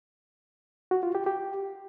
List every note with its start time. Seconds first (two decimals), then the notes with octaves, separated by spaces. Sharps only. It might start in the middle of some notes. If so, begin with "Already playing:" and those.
0.91 F#4
1.03 F4
1.15 G4
1.26 G4